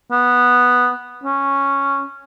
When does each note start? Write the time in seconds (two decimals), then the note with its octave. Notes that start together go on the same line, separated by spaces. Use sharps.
0.11 B3
1.24 C#4